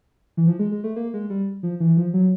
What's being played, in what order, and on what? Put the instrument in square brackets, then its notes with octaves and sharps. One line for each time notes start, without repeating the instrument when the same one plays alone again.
[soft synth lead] E3
F3
G#3
G#3
A3
A#3
G#3
G3
F3
E3
F3
F#3